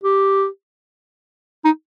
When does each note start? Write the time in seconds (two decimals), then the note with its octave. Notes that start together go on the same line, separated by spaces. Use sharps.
0.04 G4
1.65 D#4